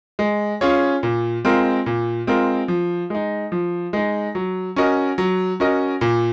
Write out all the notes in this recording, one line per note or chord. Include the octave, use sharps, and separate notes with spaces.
G#3
C#4 F4 G#4 C#5
A#2
G#3 C4 F4 A#4
A#2
G#3 C4 F4 A#4
F3
G#3 D#4
F3
G#3 D#4
F#3
C#4 F#4 A#4 D#5
F#3
C#4 F#4 A#4 D#5
A#2